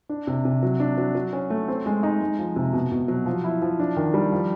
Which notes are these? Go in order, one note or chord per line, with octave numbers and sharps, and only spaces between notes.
D4
C3
C3
F#3
D4
F#3
F#3
C#4
A3
C4
G#3
D#4
G#3
F3
C3
B2
B2
F#3
F3
E4
F3
D4
D#3
G3
F3